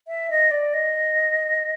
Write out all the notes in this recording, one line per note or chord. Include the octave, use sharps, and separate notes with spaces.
E5
D#5
D5
D#5